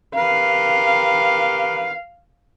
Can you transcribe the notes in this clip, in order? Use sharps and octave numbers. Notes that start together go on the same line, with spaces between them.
G4 A#4 B4 F5